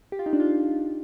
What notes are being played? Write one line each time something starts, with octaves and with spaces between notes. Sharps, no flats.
G4
F4
D#4
D4
F4